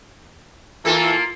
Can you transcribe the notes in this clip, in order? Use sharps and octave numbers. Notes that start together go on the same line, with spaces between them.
E3 A#3 F4 A4